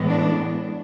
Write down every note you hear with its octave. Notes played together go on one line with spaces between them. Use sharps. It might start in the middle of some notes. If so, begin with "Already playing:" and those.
Already playing: A2 E3 G#3 B3
D4